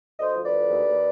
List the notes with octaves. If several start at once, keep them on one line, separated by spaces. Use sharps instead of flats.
D2 C5 D#5
F3
B4 D5
D2
D#2
D#2